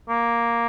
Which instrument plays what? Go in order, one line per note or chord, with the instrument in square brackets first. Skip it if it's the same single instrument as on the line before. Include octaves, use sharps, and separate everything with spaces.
[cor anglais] A#3